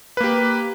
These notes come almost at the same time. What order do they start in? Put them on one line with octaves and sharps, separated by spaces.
B4 A#3 G4